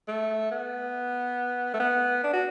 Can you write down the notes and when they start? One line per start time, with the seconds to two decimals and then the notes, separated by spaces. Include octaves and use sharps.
0.08 A3
0.51 B3
1.74 A3
1.80 B3
2.24 D4
2.33 F#4